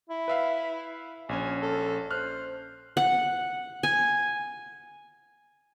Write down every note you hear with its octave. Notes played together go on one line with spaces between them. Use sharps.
E4
B4 E5 F5
A#1 C#4 G#5
A4
C5 F6 F#6
F#5
G#5